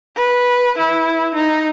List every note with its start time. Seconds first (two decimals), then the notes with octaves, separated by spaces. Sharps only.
0.16 B4
0.78 E4
1.35 D#4